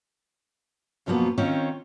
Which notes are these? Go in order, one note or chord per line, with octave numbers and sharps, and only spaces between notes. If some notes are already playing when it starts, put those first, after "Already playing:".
F#2 B2 F3 F#3 A#3 B3
D#3 C4 C#4 F4 C#5